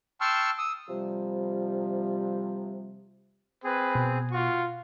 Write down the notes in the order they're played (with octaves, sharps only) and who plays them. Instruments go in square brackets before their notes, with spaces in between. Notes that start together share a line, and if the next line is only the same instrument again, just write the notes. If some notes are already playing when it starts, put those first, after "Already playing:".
[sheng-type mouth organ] G5 A5 C6 C#6 E6 F6
D#6 E6
[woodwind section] C3 F3 G3
[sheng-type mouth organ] C4 G#4 [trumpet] B4
[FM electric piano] B2
[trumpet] F4 [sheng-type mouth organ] F#4 C#6